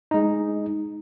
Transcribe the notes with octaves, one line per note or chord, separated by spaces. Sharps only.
G#3 D#4